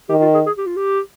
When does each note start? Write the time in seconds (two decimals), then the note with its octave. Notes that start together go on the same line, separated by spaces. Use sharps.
0.09 D#3 G4
0.22 F4
0.34 G#4
0.46 G#4
0.58 G4
0.66 F4
0.76 G4